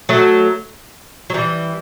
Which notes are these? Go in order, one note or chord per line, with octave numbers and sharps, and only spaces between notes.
F#3 A3
F#3
E3 G3